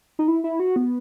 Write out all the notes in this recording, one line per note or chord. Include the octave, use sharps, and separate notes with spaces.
D#4
E4
E4
F#4
B3